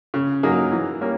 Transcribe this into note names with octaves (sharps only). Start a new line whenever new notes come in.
C#3
F#3 A#3 D#4 G#4
E3
G3 A#3 C#4